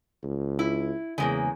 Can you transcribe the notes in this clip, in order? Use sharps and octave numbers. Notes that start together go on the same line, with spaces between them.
C#2
E4
E2 C#3 G#3 A#3